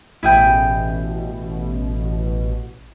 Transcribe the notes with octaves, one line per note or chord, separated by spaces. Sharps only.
A1 B2 E4 G#4 G5